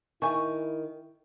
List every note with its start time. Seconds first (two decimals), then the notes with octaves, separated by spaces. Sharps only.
0.22 D#3 E4 E5 G#5 A5 C#6